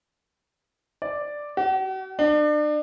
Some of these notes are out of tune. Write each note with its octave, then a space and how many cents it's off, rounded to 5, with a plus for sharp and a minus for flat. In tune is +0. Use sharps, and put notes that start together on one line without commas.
D5 +0
F#4 +45
D4 +35